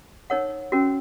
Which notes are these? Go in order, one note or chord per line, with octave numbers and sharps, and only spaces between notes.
D#4 A#4 C#5 F#5
C#4 F#4 A#4